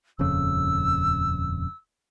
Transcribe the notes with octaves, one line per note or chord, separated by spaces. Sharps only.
D#1 F2 C#3 E6